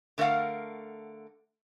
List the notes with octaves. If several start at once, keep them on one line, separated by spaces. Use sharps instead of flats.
D3 A3 A#4 D#5 F5 F#5